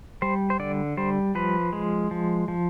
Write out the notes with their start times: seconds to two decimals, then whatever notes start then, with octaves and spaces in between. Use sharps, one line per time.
0.22 G3 C5
0.50 C5
0.60 D3 D5
0.97 G3 C5
1.35 F3 B4
1.73 G#3
2.11 F3
2.48 F3